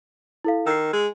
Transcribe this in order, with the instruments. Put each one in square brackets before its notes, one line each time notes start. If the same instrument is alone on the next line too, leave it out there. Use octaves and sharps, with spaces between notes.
[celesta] E4 A4 F5
[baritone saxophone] D#3 [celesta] E6 C7
[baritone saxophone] G#3